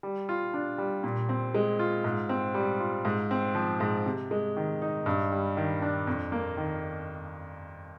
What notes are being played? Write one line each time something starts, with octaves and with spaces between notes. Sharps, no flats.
G3
F4
D4
G3
A#2
C4
G#3
F4
G#2
C4
G3
F4
G#2
C4
F3
G#2
C3
G#3
D#3
D#4
G2
G3
D#3
D4
F2
A#3
D#3